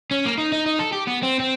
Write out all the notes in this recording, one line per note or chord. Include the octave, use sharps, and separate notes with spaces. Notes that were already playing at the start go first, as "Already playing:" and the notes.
C#4
A#3
D#4
D#4
D#4
A4
G4
B3
C4
C4